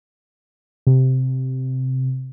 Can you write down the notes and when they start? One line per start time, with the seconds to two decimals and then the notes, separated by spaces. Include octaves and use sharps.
0.87 C3